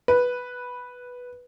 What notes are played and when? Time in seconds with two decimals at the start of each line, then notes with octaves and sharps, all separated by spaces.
0.08 B4